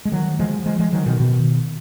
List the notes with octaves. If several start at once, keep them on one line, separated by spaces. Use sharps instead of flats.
G#3
D#3 F#3
F3 G#3
F3 G#3
F3 G#3
D#3 F#3
B2 D#3
B2 D#3